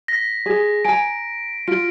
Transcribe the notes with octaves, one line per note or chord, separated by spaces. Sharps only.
A#6 B6
G#4
G#5 A#5 D7
F4 D7